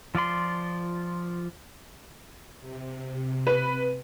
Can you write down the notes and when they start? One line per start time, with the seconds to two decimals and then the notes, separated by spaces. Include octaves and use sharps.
0.15 F3 F4 D5 C6
2.61 C3
3.47 B4